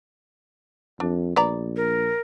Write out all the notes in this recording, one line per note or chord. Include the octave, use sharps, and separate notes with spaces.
F2 D4
A#1 B3 D5 A#5
A#4